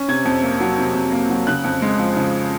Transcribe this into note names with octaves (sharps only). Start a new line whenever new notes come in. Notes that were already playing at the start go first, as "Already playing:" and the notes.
Already playing: C#4
C3 G#6
F2
A#3
F#3
C3
F2
A#3
F#3
C#3 F#6
F2
G#3
F3
C#3